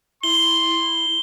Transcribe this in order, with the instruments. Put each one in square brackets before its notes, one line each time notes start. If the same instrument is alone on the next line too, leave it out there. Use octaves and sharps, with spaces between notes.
[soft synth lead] E4 [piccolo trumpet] C6 [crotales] G7